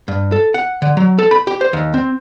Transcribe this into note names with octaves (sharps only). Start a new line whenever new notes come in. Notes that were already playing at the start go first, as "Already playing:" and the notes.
G2
A4
F#5
D3
F#3
A4
B5
G4
C5
D#2
C4